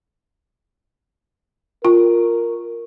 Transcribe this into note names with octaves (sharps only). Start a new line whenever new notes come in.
F4 A#4